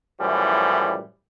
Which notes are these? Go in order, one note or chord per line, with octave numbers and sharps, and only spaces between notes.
F#2 A2 E3 F3 G3